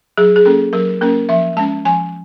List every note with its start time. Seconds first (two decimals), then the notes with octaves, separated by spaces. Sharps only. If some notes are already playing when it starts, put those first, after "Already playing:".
0.17 F#3 G#4
0.36 G#4
0.45 A#3 C#4 A4
0.73 F#3 A#4
1.01 A#3 C#4 A#4
1.29 F3 E5
1.57 G#3 C#4 A5
1.85 F3 G#5